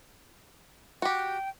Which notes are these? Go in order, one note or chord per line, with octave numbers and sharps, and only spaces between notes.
F#4 G4 G5